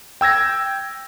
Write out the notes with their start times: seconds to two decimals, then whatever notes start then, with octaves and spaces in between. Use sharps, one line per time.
0.21 G5 E6 G#6 A#6